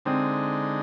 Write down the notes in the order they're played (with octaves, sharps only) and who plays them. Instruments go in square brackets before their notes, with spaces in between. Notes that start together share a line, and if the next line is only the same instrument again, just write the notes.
[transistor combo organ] D3 G#3 D#4 [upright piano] C4